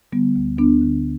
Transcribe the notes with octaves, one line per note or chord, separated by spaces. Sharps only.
D3 G3 B3
D2
D2 B3 D4
D3